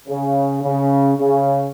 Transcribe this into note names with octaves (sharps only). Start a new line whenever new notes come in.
C#3
C#3
C#3